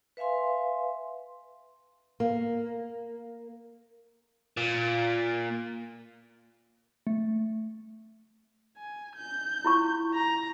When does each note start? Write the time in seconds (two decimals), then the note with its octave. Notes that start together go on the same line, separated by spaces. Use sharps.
0.17 B4 E5 F5 G#5 C6
2.20 A#3
4.57 A#2
7.07 A3
8.77 G#5
9.15 G6
9.65 E4 F4 C#6
10.14 A#5